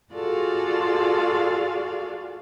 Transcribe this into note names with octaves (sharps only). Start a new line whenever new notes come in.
F4 F#4 G#4 A4 D5 F5